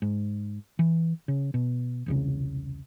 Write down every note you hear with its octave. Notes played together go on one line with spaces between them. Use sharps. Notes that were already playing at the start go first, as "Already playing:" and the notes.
G#2
E3
C#3
B2
E1 C2 C#3